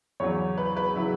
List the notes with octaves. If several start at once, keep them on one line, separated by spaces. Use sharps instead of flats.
E2 C#3 F#3 C#5
B4
B4
C#3 F#3 E4